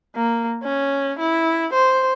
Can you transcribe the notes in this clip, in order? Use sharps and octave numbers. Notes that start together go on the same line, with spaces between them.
A#3
C#4
E4
C5